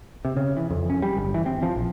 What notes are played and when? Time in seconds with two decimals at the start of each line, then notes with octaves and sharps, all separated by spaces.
0.25 C3
0.37 C#3
0.57 E3
0.71 F2
0.90 C#4
1.02 G3
1.17 G1
1.34 E3
1.46 C4
1.63 F3
1.76 A#1